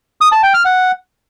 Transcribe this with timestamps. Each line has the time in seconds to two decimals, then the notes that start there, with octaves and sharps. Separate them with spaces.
0.21 D#6
0.32 A5
0.43 G5
0.54 F6
0.65 F#5